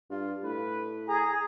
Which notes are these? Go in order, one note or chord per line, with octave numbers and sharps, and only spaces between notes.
G2 F4
A2 B4
G#4 A#5